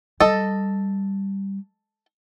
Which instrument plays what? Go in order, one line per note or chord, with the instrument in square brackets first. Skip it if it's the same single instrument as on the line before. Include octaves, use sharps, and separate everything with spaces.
[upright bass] G3 [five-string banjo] A4 D#5